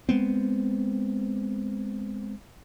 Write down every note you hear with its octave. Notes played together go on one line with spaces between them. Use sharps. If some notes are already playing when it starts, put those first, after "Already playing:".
G#3 B3 C4